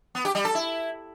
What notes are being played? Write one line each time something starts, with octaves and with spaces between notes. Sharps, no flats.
B3
G4
G3
A4
E4